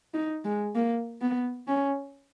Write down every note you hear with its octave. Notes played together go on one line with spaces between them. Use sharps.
D#4
G#3
A#3
B3
C#4